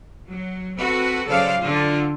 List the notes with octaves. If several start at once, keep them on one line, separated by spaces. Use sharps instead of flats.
F#3
C4 F#4 A4 B4
C#3 F#3 A4 C5 D5 F5
D3 F4